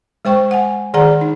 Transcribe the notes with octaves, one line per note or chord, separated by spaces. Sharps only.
G#3 C5 G5 C#6
F#5 G#5
D#3 G#4 D5 F#5 A#5
D#4